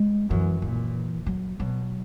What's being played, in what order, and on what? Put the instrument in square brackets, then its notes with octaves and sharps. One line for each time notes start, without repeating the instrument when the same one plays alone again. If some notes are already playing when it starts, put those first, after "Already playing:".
Already playing: [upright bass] G#3
[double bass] F#2 [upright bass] E3
[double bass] A#2 [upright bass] E3
[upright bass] F#3
[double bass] B2 [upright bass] F#3